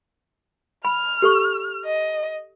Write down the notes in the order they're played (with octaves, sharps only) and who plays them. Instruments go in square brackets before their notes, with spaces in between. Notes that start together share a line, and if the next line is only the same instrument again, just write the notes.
[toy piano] B5 [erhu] F6
[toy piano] G4 A4 C#6
[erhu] D#5